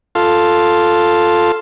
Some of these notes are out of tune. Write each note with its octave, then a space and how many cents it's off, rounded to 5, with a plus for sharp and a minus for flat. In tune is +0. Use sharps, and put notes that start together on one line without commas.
F4 +0 A4 +0